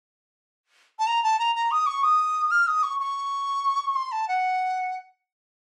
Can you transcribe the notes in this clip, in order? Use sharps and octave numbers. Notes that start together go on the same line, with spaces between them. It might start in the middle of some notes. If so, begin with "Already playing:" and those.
A5
A#5
A5
A#5
A#5
D#6
C#6
D#6
F6
D#6
C#6
C#6
C6
A5
F#5